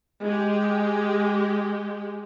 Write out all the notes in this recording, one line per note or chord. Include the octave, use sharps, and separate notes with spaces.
G#3 G4